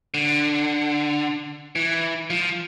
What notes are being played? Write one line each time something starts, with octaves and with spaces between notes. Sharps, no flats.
D3
E3
F3